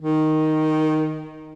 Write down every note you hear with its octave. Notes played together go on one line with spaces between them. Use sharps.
D#3